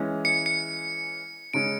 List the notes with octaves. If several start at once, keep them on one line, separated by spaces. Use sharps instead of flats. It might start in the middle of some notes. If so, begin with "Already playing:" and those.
Already playing: E3 G#3 C#4
C#7
C#7
C#3 G#3 C#4 D7